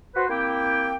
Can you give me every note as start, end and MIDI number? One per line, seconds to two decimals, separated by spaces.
0.15 0.25 66
0.15 0.25 71
0.15 0.25 72
0.30 0.95 58
0.30 0.95 60
0.30 0.95 64
0.30 0.95 67
0.30 0.95 79